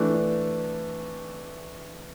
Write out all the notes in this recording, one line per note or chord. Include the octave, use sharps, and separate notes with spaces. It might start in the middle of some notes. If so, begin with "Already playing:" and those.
Already playing: E3 A3 D4